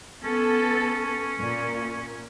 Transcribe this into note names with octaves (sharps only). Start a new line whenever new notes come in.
B3 C#4 A4
A#2